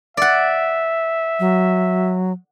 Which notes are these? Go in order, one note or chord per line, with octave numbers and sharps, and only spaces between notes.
D5 E5 F#5
F#3